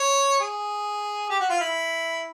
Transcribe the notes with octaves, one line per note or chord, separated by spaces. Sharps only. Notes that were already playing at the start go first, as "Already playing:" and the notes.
Already playing: C#5
G#4
G4
F#4
F4
E4